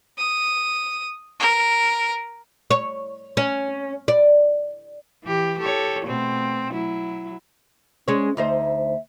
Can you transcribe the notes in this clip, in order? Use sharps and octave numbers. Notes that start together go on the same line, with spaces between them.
D#6
A#4
C#5
C#4
D5
E3 G4
G4 A4 C#5
B2 A3 C4
F#3 E4
G#3 C#4 C#5
D2 D#4 C5 E5